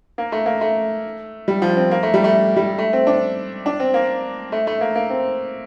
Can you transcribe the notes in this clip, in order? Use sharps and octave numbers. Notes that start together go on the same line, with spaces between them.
A#3
A3
A#3
A3
G3
F3
C4
A#3
A3
G3
A3
G3
A3
C4
D4
D4
C4
A#3
A3
A3
A#3
A#3
C4